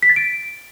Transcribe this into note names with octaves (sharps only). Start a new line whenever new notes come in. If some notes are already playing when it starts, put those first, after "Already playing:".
B6
A6
D7